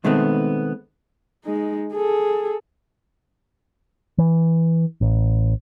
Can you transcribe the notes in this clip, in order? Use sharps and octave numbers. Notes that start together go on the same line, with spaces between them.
B2 D#3 G#3 A3 B3 C4
G#3 D#4
G#4 A4
E3
A1